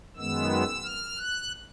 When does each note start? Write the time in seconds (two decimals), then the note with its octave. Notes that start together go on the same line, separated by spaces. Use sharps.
0.17 F#2 D#3 G#3 B3 E6
0.84 F6
1.17 F#6